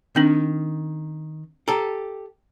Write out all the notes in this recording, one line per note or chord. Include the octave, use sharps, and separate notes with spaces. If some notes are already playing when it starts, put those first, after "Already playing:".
D#3 C4 D4
G4 A4 A#5